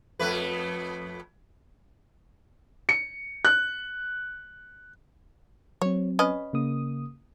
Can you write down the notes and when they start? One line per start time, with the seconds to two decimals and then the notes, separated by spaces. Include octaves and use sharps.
0.20 F2 A3 B4
2.89 C#7
3.45 F#6
5.82 F#3 C4 C#5
6.19 C#4 B4 D#5
6.53 C#3 A#3 D#6